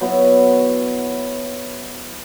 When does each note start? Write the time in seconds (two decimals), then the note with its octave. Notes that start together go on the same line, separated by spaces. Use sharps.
0.01 F#3 B3 E4